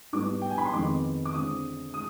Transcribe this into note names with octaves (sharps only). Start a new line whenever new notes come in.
G#2 G3 B3 D6
G5
G#5
B5
C6
F2 D#3 G#3 B3 D6
D6
D3 G#3 C4 D#6
G#3 D#6